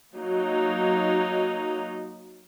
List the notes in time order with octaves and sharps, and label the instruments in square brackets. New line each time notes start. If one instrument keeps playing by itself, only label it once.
[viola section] F#3 A#3 D#4